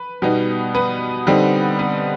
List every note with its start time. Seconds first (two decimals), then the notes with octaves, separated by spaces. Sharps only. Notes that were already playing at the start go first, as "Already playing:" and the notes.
Already playing: B4
0.22 B2 G3 B3 D#4
0.74 B3 B4
1.27 D3 G3 C4 D#4
1.79 B3 B4